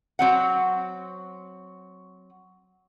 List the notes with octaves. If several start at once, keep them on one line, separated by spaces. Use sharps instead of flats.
F#3 C4 F#5